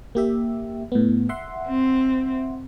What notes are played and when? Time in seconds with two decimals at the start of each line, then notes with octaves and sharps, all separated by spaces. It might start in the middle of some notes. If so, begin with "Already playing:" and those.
0.15 A#3 G4 E5
0.92 A2 B3
1.29 E5 F#5 C6
1.67 C4